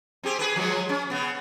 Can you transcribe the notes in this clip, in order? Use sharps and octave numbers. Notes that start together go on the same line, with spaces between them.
C4 G4 G#4
G#4 B4
F3 F#3 G#3
C#4
C#3 B3